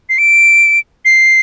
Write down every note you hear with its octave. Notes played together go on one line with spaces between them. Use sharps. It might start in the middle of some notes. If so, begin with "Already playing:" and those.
C7
D7
C7